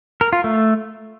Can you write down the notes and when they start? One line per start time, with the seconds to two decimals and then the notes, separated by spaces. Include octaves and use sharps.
0.21 A#4
0.33 F4
0.44 A3